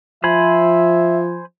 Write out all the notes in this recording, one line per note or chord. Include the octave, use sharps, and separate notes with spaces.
F3 C5 E5 G#5 B5